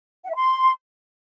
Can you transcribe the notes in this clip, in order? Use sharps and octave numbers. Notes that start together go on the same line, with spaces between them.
F#5
E5
C6